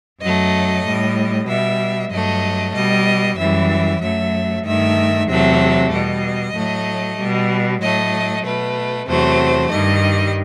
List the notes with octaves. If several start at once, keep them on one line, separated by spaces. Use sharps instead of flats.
F#2 F#3 A3 D#5
A2 G3
B2 G3 E5
G2 F#3 A3 D#5
B2 G3 D#5
F#2 E3 G3 E5
F#2 F#3 A3 E5
G2 D#3 A3 E5
E2 C3 F#3 A3 E5
B2 G3 D#5
A2 F#3 A3
B2 G3
A2 F#3 A3 D#5
B2 A3 B4
E2 C3 F#3 A3 C5
G2 D#3 G3 D#5